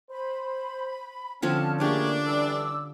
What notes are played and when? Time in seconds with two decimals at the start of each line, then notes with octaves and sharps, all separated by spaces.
0.10 C5 B5
1.42 D3 F3 C4 C#4 A5 F6
1.80 A3 A#3 D4 F4 G4 G#4 C#6
2.26 E3 G3 A4 D6 E6